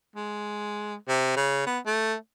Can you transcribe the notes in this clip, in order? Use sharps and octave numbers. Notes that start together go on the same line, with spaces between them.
G#3
C3
C#3
B3
A3